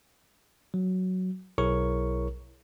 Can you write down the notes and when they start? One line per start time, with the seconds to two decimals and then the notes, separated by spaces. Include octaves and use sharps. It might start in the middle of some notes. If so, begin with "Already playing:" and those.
0.74 F#3
1.58 B1 E4 G#4 A#4 C#5 C#6